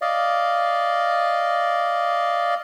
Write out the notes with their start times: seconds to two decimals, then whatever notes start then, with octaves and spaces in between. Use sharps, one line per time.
0.02 D5 D#5 F5